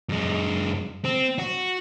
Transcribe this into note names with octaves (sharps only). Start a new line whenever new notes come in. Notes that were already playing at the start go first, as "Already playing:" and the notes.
F#2 G#3
C4
F#4